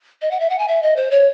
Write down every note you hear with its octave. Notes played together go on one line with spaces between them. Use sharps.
D#5
F#5
E5
F#5
G#5
E5
D#5
C5
C#5